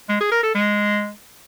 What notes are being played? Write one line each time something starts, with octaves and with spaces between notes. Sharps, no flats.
G#3
G#4
A#4
A4
G#3